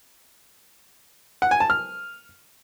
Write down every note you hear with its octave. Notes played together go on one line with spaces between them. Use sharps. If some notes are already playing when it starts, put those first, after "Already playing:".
F#5
G#5
A5
F6